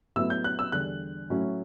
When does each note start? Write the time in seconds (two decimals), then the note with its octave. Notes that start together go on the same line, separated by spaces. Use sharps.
0.16 A2 F#3 B3 E4 E6
0.30 G6
0.44 F#6
0.59 E6
0.72 E2 D3 G3 F#6
1.30 A2 F#3 C#4 E4